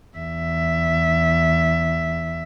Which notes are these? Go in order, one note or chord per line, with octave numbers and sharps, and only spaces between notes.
E2 E5